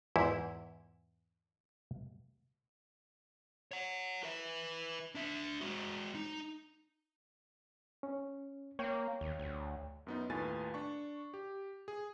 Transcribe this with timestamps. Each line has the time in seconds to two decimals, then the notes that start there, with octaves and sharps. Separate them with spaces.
0.16 E2 G#2 E4
3.71 C#5 F#5
4.24 B4 E5
5.15 D4 E5
5.61 G#3 F#4
6.15 D#4
8.03 C#4
8.79 A#3 C#5 G5
9.21 D#2
9.39 D2
10.07 F#2 B3 D#4
10.29 D#2 A2 F4 B4 G#5 A6
10.74 D4 C#6
11.34 G4
11.88 G#4